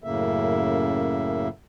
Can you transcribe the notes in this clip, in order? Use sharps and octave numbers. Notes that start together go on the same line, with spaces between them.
F#2 A2 C#3 A#3 E5